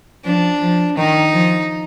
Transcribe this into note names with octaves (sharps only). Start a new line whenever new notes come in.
F3 D4
F3
D#3 D#4
F3